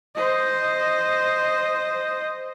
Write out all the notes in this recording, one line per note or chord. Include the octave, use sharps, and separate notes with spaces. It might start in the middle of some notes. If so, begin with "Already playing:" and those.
C5 D#5